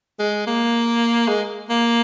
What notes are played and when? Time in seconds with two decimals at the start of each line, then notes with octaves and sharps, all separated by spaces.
0.19 G#3
0.47 A#3
1.28 G#3
1.69 A#3